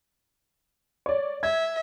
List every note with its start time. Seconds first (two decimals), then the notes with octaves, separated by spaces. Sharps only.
1.06 C#5 D5
1.43 E5 G#6